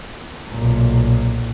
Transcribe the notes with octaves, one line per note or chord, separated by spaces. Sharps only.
B1 A#2